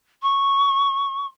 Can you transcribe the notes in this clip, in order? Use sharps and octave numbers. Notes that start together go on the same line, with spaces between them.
C#6